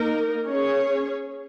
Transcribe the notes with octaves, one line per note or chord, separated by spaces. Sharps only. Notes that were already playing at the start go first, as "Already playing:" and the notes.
Already playing: A#3 D#4 A#4
C#4 G#4 C#5